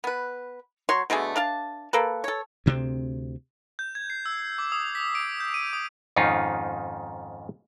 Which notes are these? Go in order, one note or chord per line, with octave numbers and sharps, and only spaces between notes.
B3 B4
F#3 C#5 C6 C#6
B2 D3 A3 G#4
D4 F5 A5
A#3 A4 B4
A4 C#5
D2 C3 B3 C4
G6
G#6
C7
E6
D6
D#6
B6
D7
G6
D#7
D#6
F2 G#2 D#3 C#4 D#4 F4